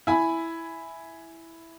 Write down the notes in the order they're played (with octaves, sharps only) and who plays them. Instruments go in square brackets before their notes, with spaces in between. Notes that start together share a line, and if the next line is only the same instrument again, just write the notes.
[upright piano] E4 G#5 B5